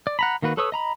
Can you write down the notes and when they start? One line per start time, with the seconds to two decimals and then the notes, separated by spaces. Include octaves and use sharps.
0.07 D5
0.19 F#5 A#5 B5
0.42 D#3 A#3 F#4 B4
0.57 A4 B4 C#5 D#6 E6
0.72 D#5 A#5 B5